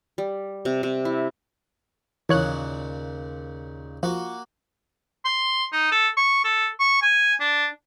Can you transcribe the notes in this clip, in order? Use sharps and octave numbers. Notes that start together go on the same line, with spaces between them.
G3
C3
C3
E4
D#2 A#2 C#3 E3 C#5 F#6
F3 A#3 F#4
C6
D#4
A4
C#6
A4
C#6
G#5
D4